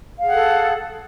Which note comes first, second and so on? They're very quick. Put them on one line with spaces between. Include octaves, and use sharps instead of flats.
F5 G#4 F#5 A4